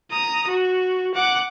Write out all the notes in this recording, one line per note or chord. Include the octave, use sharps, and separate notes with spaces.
A#5 D#6
F#4
F#5 D6